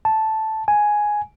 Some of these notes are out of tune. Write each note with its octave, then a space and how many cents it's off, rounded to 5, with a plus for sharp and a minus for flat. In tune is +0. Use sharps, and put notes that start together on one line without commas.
A5 -5
G#5 +5